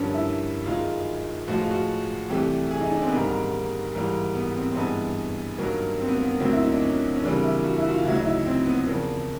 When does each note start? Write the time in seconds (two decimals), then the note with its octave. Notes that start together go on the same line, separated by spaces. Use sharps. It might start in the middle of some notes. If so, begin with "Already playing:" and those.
Already playing: G2 D3 F3 A#3 C#4
0.14 E4
0.66 F#2 D#3 G#3 F4
1.47 A2 F3 G#3 F#4
1.59 F4
1.71 F#4
2.30 C2 C3 E3 A3 G4
2.71 G#4
2.80 D#4
2.91 D4
3.01 C4
3.07 B3
3.12 G#2 D#3 G3 A#3
3.94 G#2 E3 G3 A#3
4.35 B3
4.55 C4
4.71 C4
4.76 G2 E3 G#3 B3
5.58 G2 D#3 F#3 A#3
6.00 C4
6.07 B3
6.16 A#3
6.24 B3
6.40 D2 D3 F#3 A#3 C4
6.52 E4
6.62 D#4
6.72 D4
6.81 C#4
7.16 C#4
7.23 F2 C#3 E3 G3 A#3 D4
7.43 E4
7.64 F#4
7.77 E4
7.84 F#4
7.91 F4
8.05 D2 C#3 F#3 E4
8.15 D#4
8.25 E4
8.46 C4
8.66 B3
8.87 E2 C#3 F3 A#3